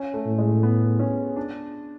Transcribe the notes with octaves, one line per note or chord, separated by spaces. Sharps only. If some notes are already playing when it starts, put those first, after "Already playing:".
Already playing: C#4
A3
A2
G#3
B3
C#4
D4